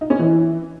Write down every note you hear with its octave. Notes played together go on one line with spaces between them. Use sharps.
D#4
C#4
E3